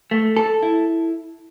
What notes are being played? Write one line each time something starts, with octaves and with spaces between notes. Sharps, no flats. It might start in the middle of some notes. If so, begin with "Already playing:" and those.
A3
A4
E4